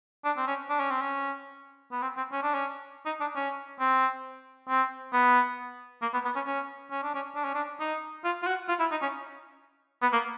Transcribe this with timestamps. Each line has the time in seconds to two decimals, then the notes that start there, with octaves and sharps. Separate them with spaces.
0.25 D4
0.38 C4
0.47 C#4
0.70 D4
0.80 C#4
0.91 C4
1.01 C#4
1.92 B3
2.02 C4
2.17 C4
2.32 C#4
2.43 D4
2.55 C#4
3.06 D#4
3.21 D4
3.36 C#4
3.80 C4
4.69 C4
5.13 B3
6.02 A#3
6.14 B3
6.25 B3
6.36 C#4
6.47 C#4
6.91 C#4
7.03 D4
7.14 C#4
7.35 D4
7.45 C#4
7.54 D4
7.80 D#4
8.24 F4
8.43 F4
8.47 F#4
8.69 F4
8.80 E4
8.92 D#4
9.02 C#4
10.02 B3
10.13 A#3